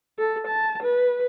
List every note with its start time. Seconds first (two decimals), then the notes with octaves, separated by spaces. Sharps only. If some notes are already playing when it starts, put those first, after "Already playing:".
0.18 A4
0.47 A5
0.83 B4